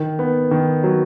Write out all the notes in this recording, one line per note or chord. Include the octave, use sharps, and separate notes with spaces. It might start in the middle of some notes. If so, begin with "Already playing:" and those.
Already playing: D#3
B3
D#3
F#3